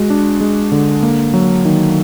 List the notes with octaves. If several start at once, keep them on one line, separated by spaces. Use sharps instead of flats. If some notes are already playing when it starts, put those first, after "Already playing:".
Already playing: G#3 F#4
D4
G#3
D3
A#3
F#3
D#3